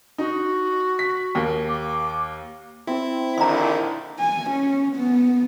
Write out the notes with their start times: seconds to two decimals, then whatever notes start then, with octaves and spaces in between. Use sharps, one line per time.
0.18 D#4 F#4
0.99 B6
1.35 D#2 A#3
1.69 D6
2.87 C4 E4 E6
3.38 A#1 D3 D#3 A#5 C6
4.19 G#5
4.51 C#4
4.96 B3